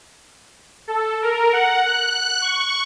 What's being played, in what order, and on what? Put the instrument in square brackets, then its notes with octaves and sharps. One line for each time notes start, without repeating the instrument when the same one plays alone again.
[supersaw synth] A4
A#4
F#5
F#6
C#6